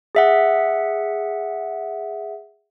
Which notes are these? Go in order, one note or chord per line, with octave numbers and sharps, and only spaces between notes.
G#4 E5 F#5